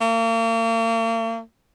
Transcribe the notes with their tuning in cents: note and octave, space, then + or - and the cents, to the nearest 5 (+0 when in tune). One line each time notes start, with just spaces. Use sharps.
A#3 -40